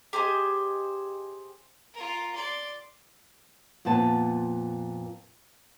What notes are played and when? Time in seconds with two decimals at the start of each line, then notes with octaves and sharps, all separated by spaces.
0.13 G4 G#4 C5 D#5
1.94 F4 A#4
2.35 D5 C6
3.85 F2 A#2 B3 A5